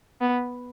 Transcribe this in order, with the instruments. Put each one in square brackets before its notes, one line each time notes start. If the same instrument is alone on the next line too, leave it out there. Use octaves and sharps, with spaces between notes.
[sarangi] B3